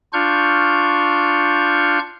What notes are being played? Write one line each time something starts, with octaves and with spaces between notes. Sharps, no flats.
D4 F4 C#6 F6 G6